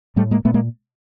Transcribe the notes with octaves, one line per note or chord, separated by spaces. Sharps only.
A2 G3 A3
G#3 A#3
A#2 A3 B3
G#3 A#3